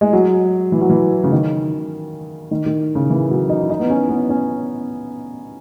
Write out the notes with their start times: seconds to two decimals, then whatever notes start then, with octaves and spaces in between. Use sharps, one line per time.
0.01 G#3
0.13 F#3
0.72 E3
0.81 F#3
0.90 E3
1.24 C#3
1.32 D#3
2.51 D#3
2.66 D#3
2.95 C#3
3.10 E3
3.30 F#3
3.49 D#4
3.61 E4
3.70 D#4
3.79 B3
3.90 C#4
4.09 B3
4.30 C#4